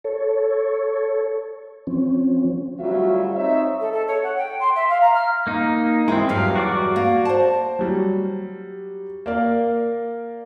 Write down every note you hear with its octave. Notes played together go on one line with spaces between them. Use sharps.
A4 C#5
F3 C4 C#4
D2 F#3 G3 F4 F#4 E5
C4 D#4 C#5 D#5 E5
A4
A4
C#5
F#5
G5
C6
E5
F5
A#5
F6
A#3 D#4
G#3 C4 E4
E2 G2 F#3 G4 F5
F#4 D5 D6
A#3
C5 A5
F#3 G3
A#3 A#4 D5 F5